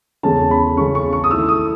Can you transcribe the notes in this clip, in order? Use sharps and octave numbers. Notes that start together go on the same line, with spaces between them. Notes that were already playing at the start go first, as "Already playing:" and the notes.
E2 C#3 G#3 C#4 A5
B5
E2 C#3 G#3 C#4 C#6
C#6
C#6
D#6
D#3 A3 E4 E6
D#6